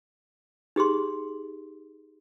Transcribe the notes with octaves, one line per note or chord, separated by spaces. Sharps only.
D#4 G4 G#4 C6